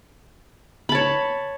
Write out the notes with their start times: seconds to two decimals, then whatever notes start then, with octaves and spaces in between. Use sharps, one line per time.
0.89 B5
0.92 A5
0.95 C#5